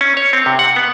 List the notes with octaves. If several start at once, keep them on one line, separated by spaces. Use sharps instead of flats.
C#4
C#5
C4
C3
F#5
B3